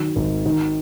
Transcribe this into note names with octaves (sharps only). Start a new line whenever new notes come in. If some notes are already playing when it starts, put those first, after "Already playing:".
Already playing: D#3 F#3
G#1
D#3